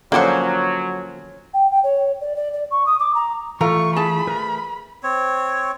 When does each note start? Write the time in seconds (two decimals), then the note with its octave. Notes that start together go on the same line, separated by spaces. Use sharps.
0.12 D3 F3 F#3 A#3 C#4 G4 C5 F#5
1.54 G5
1.71 G5
1.84 C#5
2.21 D5
2.36 D5
2.53 D5
2.71 C#6
2.86 D#6
2.99 D6
3.15 A#5
3.61 E3 A3 F4 A4 A#5 C#6
3.96 G#4 A5 B5
4.27 A3 A#4 B4
5.03 C4 C#5